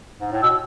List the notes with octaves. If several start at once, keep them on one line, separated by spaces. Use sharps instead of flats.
G#2
A2
B2 E6